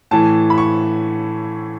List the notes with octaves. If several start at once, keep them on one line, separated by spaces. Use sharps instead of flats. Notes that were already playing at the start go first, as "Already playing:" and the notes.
A2 E3 A5
B5
C#6